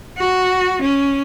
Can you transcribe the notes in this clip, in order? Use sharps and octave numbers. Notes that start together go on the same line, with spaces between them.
F#4
C#4